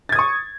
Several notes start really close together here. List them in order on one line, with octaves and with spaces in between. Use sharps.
A6 G#6 D#6 C#6